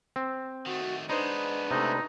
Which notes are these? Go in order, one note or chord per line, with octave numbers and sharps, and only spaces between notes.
C4
D#3 A3 F#4
G#3 B3 D4 D#4 B4 C5
C3 A3 D#4